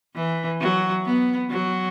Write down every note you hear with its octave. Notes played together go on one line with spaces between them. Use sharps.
E3
F#3
B3
F#3